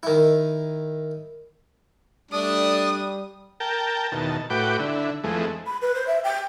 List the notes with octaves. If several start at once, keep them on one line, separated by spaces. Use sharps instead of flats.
D#3 E4
G3 A3 D4 D#6
A#4 G5 A5
E2 B2 D#3 A5
A2 F#4 B4 G5 D6
D3 E4
F2 E3 G#3 A3
B5
B4
C5
E5
G5